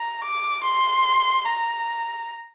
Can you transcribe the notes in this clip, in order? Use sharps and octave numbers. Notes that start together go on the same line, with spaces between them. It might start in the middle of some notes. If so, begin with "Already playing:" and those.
Already playing: A#5
D6
C6
A#5